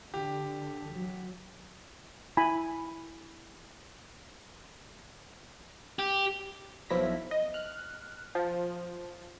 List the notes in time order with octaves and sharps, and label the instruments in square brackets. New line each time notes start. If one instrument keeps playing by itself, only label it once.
[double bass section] D3 [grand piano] G4
[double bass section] F#3
[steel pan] E4 G#5 B5
[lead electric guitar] G4
[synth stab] B1 F3 E4 A#6 B6
D#5
F6 F#6
F3